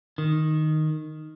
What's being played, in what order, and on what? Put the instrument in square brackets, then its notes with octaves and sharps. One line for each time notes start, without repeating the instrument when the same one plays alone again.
[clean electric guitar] D#3